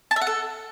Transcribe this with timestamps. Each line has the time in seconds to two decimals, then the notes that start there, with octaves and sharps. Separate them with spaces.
0.11 A5
0.16 E5
0.21 F#5
0.27 A4